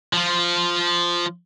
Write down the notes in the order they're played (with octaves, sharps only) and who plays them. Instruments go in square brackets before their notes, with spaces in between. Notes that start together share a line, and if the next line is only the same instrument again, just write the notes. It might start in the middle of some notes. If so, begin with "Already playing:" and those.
[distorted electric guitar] F3 F4